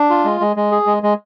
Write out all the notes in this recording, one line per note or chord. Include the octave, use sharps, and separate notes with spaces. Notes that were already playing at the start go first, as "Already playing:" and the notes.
Already playing: D4
F4
G#3
G#3
G#3
G#4
G#3
G#3